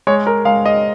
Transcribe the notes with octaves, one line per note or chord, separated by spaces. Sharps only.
G#3 C#5
A#4
G#3 F5
D#5